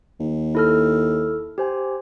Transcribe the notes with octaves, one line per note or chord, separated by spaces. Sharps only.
D#2
E4 A4 F6
G4 C5 G#5